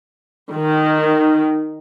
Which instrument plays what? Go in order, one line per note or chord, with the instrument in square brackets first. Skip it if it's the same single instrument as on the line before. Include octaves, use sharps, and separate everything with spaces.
[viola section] D#3